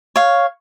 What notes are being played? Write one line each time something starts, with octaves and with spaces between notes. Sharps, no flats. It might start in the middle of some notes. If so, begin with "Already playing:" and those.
C#5 F5